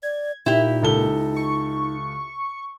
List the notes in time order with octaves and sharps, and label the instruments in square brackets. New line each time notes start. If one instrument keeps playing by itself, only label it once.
[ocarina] D5 [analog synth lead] G#6
[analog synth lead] A#2 [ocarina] D#4 [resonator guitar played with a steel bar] E4 G4
[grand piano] C#2 A4 G7
[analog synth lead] C#6